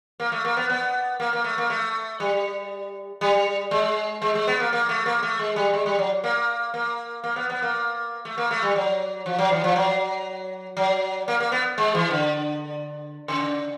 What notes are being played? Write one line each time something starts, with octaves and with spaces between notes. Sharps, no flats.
A#3
A3
A#3
B3
B3
A#3
A#3
A3
A#3
A3
G3
G3
G#3
G#3
G#3
B3
A#3
A#3
A3
A#3
A3
G#3
G3
G#3
G3
F#3
A#3
A#3
A#3
B3
B3
A#3
A3
A#3
A3
G3
F#3
F3
F#3
E3
F3
F#3
F#3
A#3
A#3
B3
G#3
E3
D3
C#3